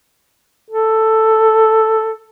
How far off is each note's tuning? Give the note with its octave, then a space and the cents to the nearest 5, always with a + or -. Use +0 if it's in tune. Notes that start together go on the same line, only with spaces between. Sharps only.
A4 +5